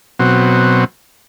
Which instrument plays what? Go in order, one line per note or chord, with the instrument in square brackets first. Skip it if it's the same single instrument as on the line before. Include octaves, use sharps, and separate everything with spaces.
[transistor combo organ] B2 F#3 C4